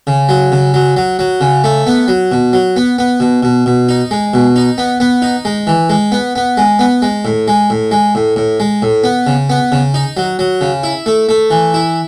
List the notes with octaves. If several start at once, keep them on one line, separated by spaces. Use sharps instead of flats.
C#3
F#3
C#3
F#3
F#3
F#3
C#3
A3
B3
F#3
B2
F#3
B3
B3
B2
B2
B2
D#4
G#3
B2
D#4
B3
B3
D#4
G#3
E3
G#3
B3
B3
G#3
B3
G#3
A2
G#3
A2
G#3
A2
A2
G#3
A2
B3
C#3
B3
C#3
D#4
F#3
F#3
C#3
E4
A3
A3
E3
E4